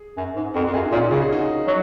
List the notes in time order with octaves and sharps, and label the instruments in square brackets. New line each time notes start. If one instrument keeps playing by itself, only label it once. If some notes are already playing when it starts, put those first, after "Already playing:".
Already playing: [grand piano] G#4
[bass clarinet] F#2
G#2
[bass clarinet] F2 [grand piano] F#4 A#4
[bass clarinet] F2
[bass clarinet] F#2 [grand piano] F4 G#4
[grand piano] D#4
[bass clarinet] A#2 [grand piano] C#4 F4
[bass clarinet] C#3 [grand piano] F#4
[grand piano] G#4
D#4 F#4
[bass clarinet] F#3